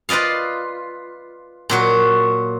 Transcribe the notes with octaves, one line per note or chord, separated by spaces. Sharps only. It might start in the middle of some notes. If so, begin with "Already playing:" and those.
F4 B4 D5 D#5 F5
A#2 F#3 F#4